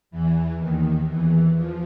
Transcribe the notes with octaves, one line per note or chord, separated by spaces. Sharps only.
E2 E3
D#2 D#3
E2 E3
F3